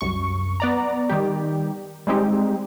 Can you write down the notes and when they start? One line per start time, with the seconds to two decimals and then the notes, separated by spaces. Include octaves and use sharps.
0.01 C2 F#2 C#6
0.60 B3 D5 A#5
1.09 D#3 G3 G4
2.07 G3 G#3 C4 D#4 G4